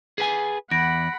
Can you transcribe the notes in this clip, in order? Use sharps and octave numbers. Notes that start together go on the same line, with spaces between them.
G#4 B4 G#5
E2 F#5 B5 A#6 D7